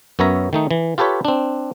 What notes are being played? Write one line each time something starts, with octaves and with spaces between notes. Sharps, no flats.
F#2 B3 A#4 C#5 E5 A#5
D#3 A3 D#4
E3
F4 G4 A4 B4 C#5
C4 D4